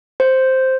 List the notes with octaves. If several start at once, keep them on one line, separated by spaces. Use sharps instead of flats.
C5